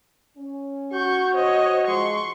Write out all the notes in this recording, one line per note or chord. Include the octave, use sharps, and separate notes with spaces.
C#4
F#4 C#6 G6
C5 C#5 D#5
F3 G#3 C6 C#6